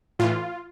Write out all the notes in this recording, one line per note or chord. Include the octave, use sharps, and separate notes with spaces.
A2 E3 F4